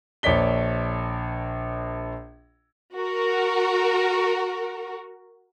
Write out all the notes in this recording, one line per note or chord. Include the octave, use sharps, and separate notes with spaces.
A#1 C#5 D5 B6 G7
F#4 A#4